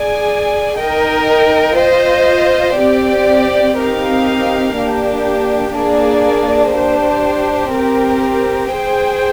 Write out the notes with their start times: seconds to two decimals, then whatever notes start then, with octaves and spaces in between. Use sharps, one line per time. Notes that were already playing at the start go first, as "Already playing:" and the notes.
Already playing: G#4 D5 G#5
0.81 D#4 A#4 D#5 G5
1.80 F4 C5 D#5
2.79 C4 G4 D5
3.78 C4 D#4 G4 A#4 F5
4.77 A#3 D4 G4
5.76 A#3 D4 G#4 D5
6.75 D4 G4 C5
7.74 C4 G4 A#4
8.74 G#4 C5 G5